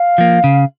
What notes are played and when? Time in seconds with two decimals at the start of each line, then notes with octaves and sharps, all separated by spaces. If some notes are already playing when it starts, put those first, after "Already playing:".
Already playing: F5
0.18 F3 A#3
0.44 C#3